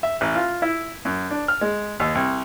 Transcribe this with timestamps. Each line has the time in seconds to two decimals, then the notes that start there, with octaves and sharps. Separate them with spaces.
0.03 E5
0.21 A1
0.35 F4
0.62 E4
1.05 F#2
1.31 D4
1.48 F6
1.61 G#3
2.00 D#2
2.15 C2